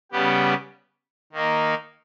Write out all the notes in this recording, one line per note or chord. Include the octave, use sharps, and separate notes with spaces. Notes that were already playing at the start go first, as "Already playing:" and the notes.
C#3 G3 B3 G4
D#3 A#3 D#4